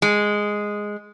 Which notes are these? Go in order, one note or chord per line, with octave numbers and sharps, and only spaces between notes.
G#3